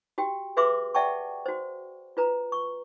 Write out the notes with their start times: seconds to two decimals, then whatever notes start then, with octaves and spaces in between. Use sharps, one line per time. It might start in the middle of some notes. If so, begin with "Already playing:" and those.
0.18 F#4 G4 G5
0.57 F#4 G#4 B4 E5 C6 D6
0.94 D5 E5 F#5 G5 A5 C#6
1.46 F#4 C5
2.17 F4 B4 A#5
2.52 C#6